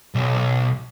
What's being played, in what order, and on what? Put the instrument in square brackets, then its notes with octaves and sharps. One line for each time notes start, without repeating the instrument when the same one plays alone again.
[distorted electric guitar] B1